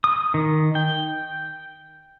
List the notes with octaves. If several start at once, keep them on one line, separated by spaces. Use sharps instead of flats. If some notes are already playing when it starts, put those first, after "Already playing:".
D#6
D#3
G5